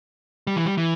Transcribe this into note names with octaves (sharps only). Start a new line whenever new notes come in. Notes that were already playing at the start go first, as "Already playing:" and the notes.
G3
E3
G3
E3